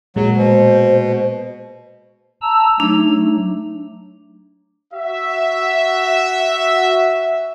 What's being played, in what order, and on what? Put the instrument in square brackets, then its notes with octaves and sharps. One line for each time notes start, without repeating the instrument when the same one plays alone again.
[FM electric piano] A#2 G#3 A#3 [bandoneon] F#3
[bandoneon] B2 [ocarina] C5
[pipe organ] A5 A#5 E6
[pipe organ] F#3 A3 D#4 [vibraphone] D4
[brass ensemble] F#4 E5